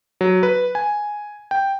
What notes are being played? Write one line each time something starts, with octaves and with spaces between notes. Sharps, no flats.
F#3
B4
G#5
G5